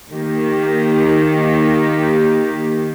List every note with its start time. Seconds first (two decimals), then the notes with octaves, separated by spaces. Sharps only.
0.12 D#3 A#3 G4